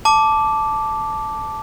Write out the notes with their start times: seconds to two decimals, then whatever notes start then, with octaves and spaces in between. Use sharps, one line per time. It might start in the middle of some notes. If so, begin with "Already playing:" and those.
0.05 A5 D6